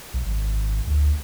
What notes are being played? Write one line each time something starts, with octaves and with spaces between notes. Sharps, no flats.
B1
G#1
D2